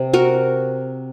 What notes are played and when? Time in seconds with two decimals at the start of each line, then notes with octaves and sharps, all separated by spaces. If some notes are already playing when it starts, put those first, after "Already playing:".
Already playing: C3
0.13 F#4 A#4